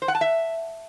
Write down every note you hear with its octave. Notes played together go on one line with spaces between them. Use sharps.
C5
F#5
A5
E5